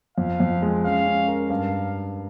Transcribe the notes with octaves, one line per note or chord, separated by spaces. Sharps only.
F2 F5
F2
G#3
C#4 F5
C#4
A#4
G2 F5